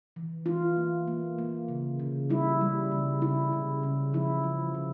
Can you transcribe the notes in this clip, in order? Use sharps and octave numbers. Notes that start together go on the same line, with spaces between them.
E3
E3 F4
A#3
A#3
A#3
C#3
C#3
G3 E4
G3
C#3
C#3 E4
C#3
C#3
F3 E4
F3
C#3